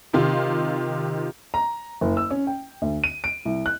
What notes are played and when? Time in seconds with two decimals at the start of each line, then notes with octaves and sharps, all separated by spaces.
0.13 C3 D#3 F4
1.54 A#5
2.01 F#1
2.17 E6
2.31 C#4
2.47 G5
2.82 D2
3.04 D#7
3.24 D7
3.45 C2
3.66 F#6